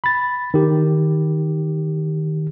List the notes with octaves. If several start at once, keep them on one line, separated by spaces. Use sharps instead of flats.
B5 A6
D#3 G4